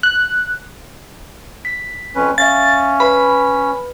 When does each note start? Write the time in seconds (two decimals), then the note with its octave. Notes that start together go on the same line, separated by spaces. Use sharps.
0.03 F#6
1.65 B6
2.15 F2 C#4 B4
2.38 C#4 E5 F5 A6
3.00 B4 B5